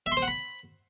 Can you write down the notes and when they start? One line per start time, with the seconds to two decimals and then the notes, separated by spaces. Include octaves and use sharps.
0.06 E5
0.12 C6
0.17 C5
0.22 F#5
0.28 B5